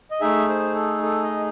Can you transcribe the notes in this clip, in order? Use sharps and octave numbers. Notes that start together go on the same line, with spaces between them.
D#5
A3 D#4 G#4 E5
C5
A4
A4
D#5